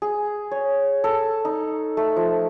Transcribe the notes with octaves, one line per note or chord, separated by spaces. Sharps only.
G#4
C#5
A4
D#4
A3
F3